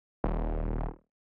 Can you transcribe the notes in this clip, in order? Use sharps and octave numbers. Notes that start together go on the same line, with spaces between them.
D#1